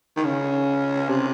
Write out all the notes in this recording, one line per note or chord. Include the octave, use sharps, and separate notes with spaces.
D#3
C#3
C3